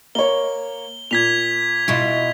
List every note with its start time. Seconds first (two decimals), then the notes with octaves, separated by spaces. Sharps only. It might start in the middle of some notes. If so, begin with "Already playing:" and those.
0.15 A#3 C#5 G7
1.11 A#2 G#6 B6 F7
1.88 B2 E4 F4